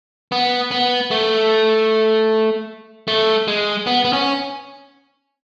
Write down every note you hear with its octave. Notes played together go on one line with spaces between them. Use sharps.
B3
B3
A3
A3
G#3
B3
B3
C#4